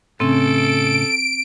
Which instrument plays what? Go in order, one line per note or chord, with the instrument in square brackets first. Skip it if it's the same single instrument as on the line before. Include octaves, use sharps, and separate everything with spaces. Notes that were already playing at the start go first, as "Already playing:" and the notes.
[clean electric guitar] A2 C#3 [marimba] C4 [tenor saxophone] A4 [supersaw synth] D7